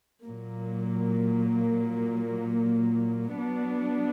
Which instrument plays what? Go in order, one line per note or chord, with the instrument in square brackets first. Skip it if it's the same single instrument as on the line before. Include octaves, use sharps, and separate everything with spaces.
[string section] A#2 F#3 A#3
F#3 B3 D4